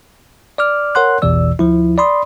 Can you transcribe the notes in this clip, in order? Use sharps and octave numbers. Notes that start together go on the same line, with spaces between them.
D5 D6 F6
A#4 C#5 F#5 C6 F#6
A1 E2 B2 E3 D5 E6
D2 F3 E4
D5 B5 C6 D#6